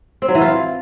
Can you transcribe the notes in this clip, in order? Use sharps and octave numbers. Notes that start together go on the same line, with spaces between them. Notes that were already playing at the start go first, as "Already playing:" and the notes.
C4
F#3
E3
F4